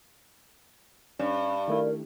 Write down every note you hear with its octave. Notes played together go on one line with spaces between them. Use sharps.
G2 C#4 D5
D#3 A3 E4 A#4